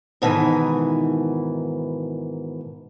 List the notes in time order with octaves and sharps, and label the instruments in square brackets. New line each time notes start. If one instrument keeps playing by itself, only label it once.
[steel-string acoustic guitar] G#2 B2 D#3 E3